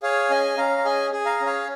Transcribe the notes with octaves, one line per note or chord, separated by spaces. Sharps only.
G#4 C#5 F5
C#4 D#5 G#5
C#4 F5 A#5
A#5
G#4 D#5 G#5
G#4
F5 A#5
C#4
C#5 F5